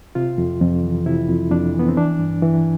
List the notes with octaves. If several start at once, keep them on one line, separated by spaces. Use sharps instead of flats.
C3 F4
F2
F2
E3
C3 E4
F2
F2 D4
E3 B3
C4
E3 D4
G2
E3